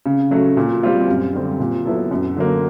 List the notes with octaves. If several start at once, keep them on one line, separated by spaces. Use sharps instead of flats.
C#3
F#3 A3 C#4 F#4
A#2
G3 C4 F4
F#2
D3 G3 C4
A#2
F#3 B3 E4 A4
F#2
D3 F#3 A#3